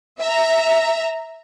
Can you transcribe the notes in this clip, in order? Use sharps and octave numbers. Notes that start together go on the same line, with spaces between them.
E5 A#5